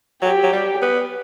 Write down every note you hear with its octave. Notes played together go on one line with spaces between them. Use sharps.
F#3 G4
F#3
G3
B3